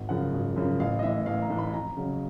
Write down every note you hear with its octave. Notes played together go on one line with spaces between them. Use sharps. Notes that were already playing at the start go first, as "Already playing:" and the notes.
Already playing: G#1
F#2 C#3 F3 F#5
G#1
F#2 C#3 F3
A1 F5
D#5
A2 E3 E5
A1 F5
A#5
A2 E3
B5
F2 A#5
C#3 F#3